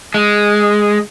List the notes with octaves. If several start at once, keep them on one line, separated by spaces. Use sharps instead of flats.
G#3